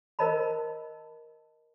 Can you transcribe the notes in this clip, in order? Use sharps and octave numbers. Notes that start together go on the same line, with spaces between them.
A#4 C5 D#5 A5 B5